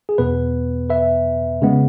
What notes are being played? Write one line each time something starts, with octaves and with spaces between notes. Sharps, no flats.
G#4
E2 B2 B3 B4
B4 E5
C#3 G#3 B3